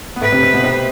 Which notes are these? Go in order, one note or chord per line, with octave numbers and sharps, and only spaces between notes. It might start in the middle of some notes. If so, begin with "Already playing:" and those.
B3
A2 A3 B4
C3 C4
C3 C4
B2 B3
C3 C4